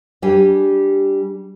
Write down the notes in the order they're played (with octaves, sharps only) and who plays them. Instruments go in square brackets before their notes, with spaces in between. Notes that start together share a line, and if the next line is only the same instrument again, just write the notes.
[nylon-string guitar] G3 D4 G4 G#4